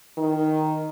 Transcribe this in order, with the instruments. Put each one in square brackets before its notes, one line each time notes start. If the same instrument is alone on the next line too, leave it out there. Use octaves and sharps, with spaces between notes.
[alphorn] D#3